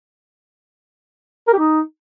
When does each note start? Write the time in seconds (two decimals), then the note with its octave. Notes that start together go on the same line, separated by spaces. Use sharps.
1.47 A#4
1.53 G4
1.59 D#4